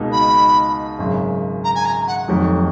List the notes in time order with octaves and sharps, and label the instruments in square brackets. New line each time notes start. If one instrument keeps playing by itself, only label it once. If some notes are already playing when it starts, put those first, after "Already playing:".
Already playing: [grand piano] C#2 B2 A#3 D#4 F#4
[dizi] B5
[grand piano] G#1 F#2 C#3
[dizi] A#5
G#5
A#5
F#5
[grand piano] F1 F2 D#3 F#3